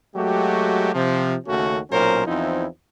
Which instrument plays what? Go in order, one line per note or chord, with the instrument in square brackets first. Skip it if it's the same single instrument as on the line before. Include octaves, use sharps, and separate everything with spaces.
[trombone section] F#3 G#3 A3 F#4 G4
C3 F3
D#2 C#3 A3 C#4 F#4
B1 A#2 F#3 C#4 A#4 C5
E2 F3 C4 D#4 E4